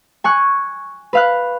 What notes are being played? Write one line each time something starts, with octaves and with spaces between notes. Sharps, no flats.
G#5 C#6 F#6
B4 F5 F#6